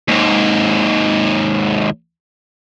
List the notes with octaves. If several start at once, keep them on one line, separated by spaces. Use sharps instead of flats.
D#2 G#2